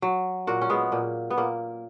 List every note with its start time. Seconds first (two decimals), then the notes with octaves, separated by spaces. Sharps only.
0.02 F#3
0.47 A#2 F#4 A#4
0.61 C#4
0.70 G#3 B3
0.92 A#2 A#3
1.30 B3
1.37 A#2 A#3